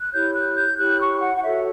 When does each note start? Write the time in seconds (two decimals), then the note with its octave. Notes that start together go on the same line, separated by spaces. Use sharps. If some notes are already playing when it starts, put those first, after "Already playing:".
0.01 F#6
0.12 E4 G4 C#5 G6
0.34 F#6
0.56 G6
0.78 E4 G4 C#5 F#6
0.99 C#6
1.21 F#5
1.37 F#5
1.42 F#4 A4 C#5 E5